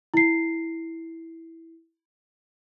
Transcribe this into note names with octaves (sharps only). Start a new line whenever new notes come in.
E4 C7